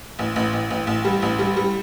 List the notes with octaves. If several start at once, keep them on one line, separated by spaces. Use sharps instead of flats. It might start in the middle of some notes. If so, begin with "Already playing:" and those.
A1
A1
A1
A1
A1
G3
A1
G3
G3